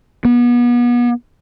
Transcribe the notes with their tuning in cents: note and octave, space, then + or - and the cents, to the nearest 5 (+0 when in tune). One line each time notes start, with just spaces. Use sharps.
B3 -35